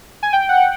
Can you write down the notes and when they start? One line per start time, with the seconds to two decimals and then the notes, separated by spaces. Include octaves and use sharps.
0.23 G#5
0.33 G5
0.49 F#5